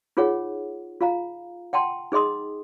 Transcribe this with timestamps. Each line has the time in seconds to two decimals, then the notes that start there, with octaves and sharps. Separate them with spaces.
0.17 D#4 F4 G#4 C#5 F#5
1.01 F4 F5 A#5
1.73 F#5 G5 A5 C6
2.12 D#4 G#4 D#5 C6 D#6